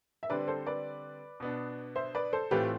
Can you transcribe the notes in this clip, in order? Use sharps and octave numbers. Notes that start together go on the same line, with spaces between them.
E5
D3 G3 C4 B4 D5
A4 C5
B4 D5
B2 B3 D4
C5 E5
B4 D5
A4 C5
A2 E3 A3 C4 F4 G4 B4